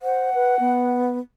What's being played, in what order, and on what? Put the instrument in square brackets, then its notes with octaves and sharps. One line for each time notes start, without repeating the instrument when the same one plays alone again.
[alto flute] C5 [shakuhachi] F#5
[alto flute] B4
B3